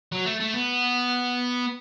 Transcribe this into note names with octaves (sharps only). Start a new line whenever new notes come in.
F#3
A3
A3
B3